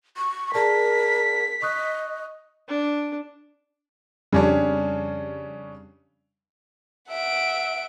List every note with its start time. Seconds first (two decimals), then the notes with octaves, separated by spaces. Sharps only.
0.17 C#6
0.54 G#4 A#4 D5 A5 B6
1.62 D#5 C#6 D#6 F#6
2.68 D4
4.32 F2 C#3 G3 C#4 D4
7.10 E5 F#5 D7